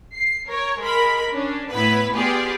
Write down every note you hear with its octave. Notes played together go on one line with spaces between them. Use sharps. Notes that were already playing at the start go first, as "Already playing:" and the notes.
C7
A#4 C#5
G#3 A#4 B5
C#4 D4
A2 B3 E4 B4 B5
B3 F4 G4 G#4 D5